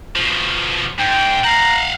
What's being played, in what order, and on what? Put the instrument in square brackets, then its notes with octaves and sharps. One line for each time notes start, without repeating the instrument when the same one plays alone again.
[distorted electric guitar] B2 F3
[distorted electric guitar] G#2 [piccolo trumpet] G5
[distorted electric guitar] F5 F#5 [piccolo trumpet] A#5